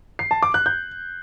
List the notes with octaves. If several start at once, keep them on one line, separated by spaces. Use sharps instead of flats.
C7
A5
D6
F#6
G6